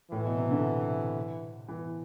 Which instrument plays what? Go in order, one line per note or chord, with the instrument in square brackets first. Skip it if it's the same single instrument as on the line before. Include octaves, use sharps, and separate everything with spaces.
[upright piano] A2 [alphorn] E3
[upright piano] B2
C3
D3
E3